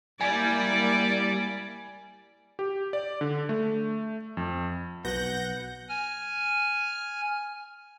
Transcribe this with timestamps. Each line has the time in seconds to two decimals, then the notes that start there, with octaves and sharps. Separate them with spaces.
0.21 G3 A#3 E4 D5 G#5
2.59 G4
2.93 D5
3.21 D3
3.49 A3
4.37 F2
5.05 B1 B3 F#4 B4 F#5 G6 A#6
5.89 G#5 F6